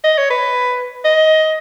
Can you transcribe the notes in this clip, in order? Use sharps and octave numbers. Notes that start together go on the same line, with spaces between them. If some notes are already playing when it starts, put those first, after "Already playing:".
D#5
C#5
B4
D#5